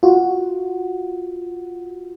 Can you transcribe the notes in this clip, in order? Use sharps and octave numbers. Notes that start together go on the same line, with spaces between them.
F4 F#4